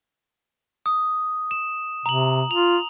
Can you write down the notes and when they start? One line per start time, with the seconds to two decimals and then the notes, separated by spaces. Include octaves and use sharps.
0.86 D#6
1.51 E7
2.06 C3 A#5 F#7
2.51 F4 F7